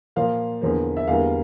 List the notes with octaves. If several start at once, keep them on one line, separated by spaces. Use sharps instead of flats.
A#2 F3 A#3 F5
E2 D3 F3 A#3
E5
E2 D3 G3 A#3 F5